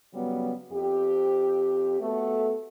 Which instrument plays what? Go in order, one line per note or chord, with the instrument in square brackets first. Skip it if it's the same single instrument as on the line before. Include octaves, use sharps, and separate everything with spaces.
[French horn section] C#3 F#3 G3 B3
F2 C4 G4
A3 B3 F#4 A4